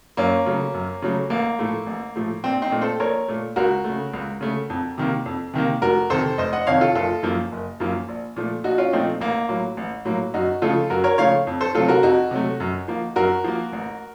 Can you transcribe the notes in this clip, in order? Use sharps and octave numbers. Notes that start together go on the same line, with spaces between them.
F#2 A#3 C#4
C#3 F#3 A3
F#2
C#3 F#3 A3
A1 A#3
A2 F3 A3
A1
A2 F3 A3
A#1 C4
C4 D#4
A#2 A3
A4 C5
A#1 A#4 C#5
A#2 A3
C#2 F#4 A#4
C#3 A3
C#2
C#3 A3
F2
C3 D#3 A#3
F2
C3 D#3 A#3
F1 F#4 A#4
F2 C3 D#3 A4 C5
F1 C5 D#5
D#5 F#5
F2 C3 D#3 C#5 F5
F4 A4
F#1 F4 A4
F#2 F3 A#3
F#1
F#2 F3 A#3
A#1
A#2 F3 A3
A#1 D#4 F#4
C#4 F4
A#2 F3 A3 C4 D#4
A1 A#3
A2 F#3 A#3
A1
A2 F#3 A#3
F#2 D#4 F#4
C#3 F3 A3 F4 A4
F#2 F#4 A#4
A#4 C#5
C#3 F3 A3 C#5 F5
F2
A4 C5
C3 F#3 A3 F4 A4
F#4 A#4
F2 D#4 F#4
C3 F#3 A3
F#2
F3 A#3
F#2 F#4 A#4
F3 A#3
A1